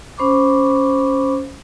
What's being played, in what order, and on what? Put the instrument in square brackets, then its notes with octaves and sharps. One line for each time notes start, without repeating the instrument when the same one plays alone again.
[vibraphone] C#4 C5 B5 C#6 D6